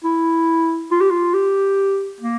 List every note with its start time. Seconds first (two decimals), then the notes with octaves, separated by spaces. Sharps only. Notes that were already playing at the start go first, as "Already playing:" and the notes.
0.04 E4
0.91 F4
1.00 G4
1.10 F4
1.34 G4
2.20 A#3